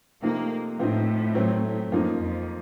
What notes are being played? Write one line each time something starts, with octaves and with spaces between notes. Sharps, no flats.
C3 F3 A3 A#3 D#4
A2 F3 C4 D#4
F#3 A3 C4
A2
F#2 F3 A#3 D#4
F2